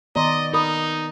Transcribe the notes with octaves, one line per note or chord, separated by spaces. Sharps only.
D#3 B3 D5 D#5 A#5 C6
D#4 A#4 B5 D#6